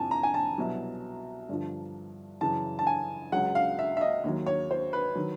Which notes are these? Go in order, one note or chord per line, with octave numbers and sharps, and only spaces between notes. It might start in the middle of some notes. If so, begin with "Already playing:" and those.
Already playing: F2 C3 E3 G#5 A5
A#5
G#5
A5
C2 B2 F#3
G2 D3 F3
F#2 C#3 E3 A5
A5
G#5
C#2 C#3 F#3 F#5
F5
E5
E5
D#5
D#2 D#3 F#3
C#5
C5
B4
D#3 F#3